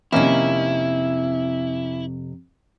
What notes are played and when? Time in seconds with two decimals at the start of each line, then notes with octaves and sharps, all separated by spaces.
0.12 F2 C3 D#3 A#3 C#4 E4